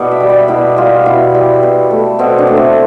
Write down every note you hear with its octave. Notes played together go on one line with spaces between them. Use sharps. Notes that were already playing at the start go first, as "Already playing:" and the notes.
Already playing: B2 E4 A4 D5
E5
G3
D5
B2 E4
G3 F4
B2 E4
G3
B2
A3
B2 C4
D4
A3
C4